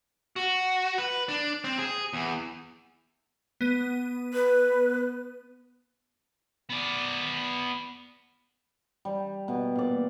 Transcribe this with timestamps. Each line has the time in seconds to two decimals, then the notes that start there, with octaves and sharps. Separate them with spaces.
0.36 F#4
0.98 B4
1.29 D4
1.64 C4
1.78 G#4
2.13 E2
3.61 B3 D#7
4.33 B4
6.69 B3 D5
9.05 G3
9.48 B2 E5
9.76 A#2 D5